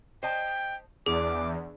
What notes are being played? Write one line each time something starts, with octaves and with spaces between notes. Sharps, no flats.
C5 D#5 G5 A5
E2 D4 G#4 D6